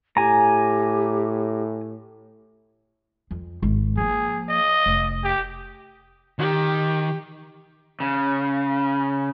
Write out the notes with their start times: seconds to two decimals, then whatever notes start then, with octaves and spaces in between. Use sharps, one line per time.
0.17 A2 G4 G#5 A#5
3.31 F2
3.62 G#1
3.97 F3 A#3 G#4
4.49 D#5
4.86 F1
5.23 G4
6.39 D#3 G4
8.00 C#3